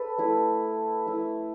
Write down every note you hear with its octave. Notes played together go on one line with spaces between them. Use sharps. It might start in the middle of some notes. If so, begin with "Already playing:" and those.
Already playing: A4 B4
A3 E4
A3 E4